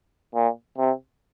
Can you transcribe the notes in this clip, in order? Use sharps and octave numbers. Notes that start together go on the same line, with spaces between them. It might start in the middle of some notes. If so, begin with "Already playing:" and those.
A#2
C3